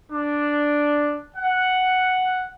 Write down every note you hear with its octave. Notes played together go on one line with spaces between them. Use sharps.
D4
F#5